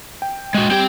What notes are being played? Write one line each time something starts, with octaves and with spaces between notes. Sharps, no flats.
G5
G#3 F#4
G3 C4 G4 G5 G#6